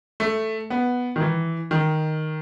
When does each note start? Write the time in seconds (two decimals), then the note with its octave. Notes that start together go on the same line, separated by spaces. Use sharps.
0.20 A3
0.70 B3
1.16 D#3
1.21 E3
1.71 D#3